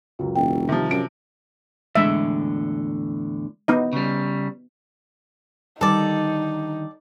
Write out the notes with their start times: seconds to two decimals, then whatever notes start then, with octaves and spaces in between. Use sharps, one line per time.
0.19 C#2 F#2
0.36 E1 G5
0.69 C3 D#3 F3 G3
0.91 F#2 D7
1.95 E2 A2 D3 G#3 E5
3.68 B3 D#4 D#5
3.93 C#3 G3
5.81 D3 D#3 G3 D#4 A4 D5